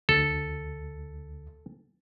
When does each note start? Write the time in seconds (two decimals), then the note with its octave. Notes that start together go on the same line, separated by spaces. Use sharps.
0.09 D2 A4